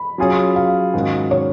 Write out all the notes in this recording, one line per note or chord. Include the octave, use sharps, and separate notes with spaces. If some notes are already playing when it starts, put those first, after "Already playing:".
Already playing: B5
F#3 C#4 F4 G#4 C#5
F5
G#2 D#3 G#3 C#4 F#4
C#5